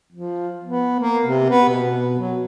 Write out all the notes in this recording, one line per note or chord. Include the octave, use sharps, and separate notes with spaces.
F3
B3
A#3
C3
B3
B2
F#3